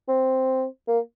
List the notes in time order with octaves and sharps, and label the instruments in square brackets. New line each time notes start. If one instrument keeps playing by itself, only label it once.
[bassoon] C4
A#3